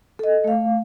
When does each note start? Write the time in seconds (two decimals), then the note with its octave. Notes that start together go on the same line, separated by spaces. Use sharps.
0.19 A4 D#5
0.44 A3 F5